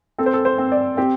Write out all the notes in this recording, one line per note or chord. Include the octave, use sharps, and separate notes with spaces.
C4 A4
C5
A4
C5
C4
D5
C4 G4